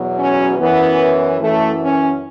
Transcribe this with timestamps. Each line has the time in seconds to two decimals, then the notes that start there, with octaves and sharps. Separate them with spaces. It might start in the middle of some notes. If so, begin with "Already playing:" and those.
Already playing: E2 B2 F#3
0.17 C#4
0.58 F#2 E3 B3
1.39 F#2 E3 A3
1.81 C#4